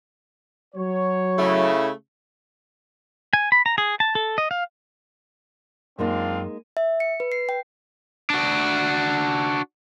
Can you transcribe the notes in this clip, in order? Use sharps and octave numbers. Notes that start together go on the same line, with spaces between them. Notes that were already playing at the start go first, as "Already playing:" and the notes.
F#3 C#5
C#3 A3 E4
G#5
B5
A#5
G#4
A5
A4
D#5
F5
F#2 G#3 A#3 C4 D4 D#4 F4
E5
C#7
B4
C7
G5
D4 F#4